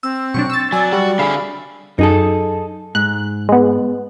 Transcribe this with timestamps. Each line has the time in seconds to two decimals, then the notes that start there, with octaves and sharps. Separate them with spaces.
0.03 C4 E6
0.34 B2 F#3 D4 C#6
0.50 E6 A6
0.72 F#3 D5 G#5
0.93 G3 F#4
1.19 D3 G#4 E5 F5 B5
1.99 F#2 D#4 G#4 A4
2.95 G#2 F#6
3.49 G#3 B3